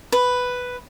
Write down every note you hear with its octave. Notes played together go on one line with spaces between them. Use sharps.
B4